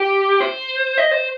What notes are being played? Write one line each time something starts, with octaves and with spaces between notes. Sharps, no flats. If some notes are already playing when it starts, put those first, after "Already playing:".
Already playing: G4
C5
D#5
C5